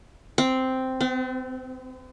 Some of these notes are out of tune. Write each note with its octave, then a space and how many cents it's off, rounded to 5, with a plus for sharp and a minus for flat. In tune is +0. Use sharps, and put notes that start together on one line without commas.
C4 -5
C4 -45